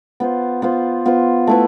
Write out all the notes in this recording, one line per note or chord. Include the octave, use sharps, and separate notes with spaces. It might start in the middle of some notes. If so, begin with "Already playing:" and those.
B3 F4 C5
B3 F4 C5
B3 F4 C5
A3 E4 B4